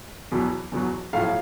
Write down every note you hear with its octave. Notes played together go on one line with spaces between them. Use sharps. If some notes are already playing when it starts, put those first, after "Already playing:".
E2 B2 F#3
E2 B2 F#3
B1 A2 F3 F5